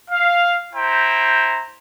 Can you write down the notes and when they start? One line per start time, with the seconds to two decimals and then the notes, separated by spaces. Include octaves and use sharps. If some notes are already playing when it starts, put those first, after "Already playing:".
0.10 F5
0.73 E4 C5 G5 A#5